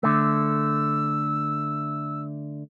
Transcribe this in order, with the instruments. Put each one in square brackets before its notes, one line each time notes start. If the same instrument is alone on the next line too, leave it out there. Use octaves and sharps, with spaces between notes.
[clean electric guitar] D3 A3 [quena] E6